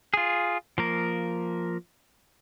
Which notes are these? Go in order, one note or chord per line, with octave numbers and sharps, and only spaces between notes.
F4 G#4
F3 A#3 A#4